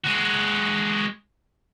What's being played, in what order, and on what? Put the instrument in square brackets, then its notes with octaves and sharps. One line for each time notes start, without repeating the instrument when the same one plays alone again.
[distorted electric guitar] G#3 F#4